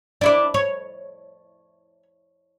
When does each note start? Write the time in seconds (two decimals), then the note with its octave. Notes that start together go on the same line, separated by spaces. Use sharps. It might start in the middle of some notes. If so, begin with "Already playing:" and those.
0.21 D4 E4 D5
0.54 C#5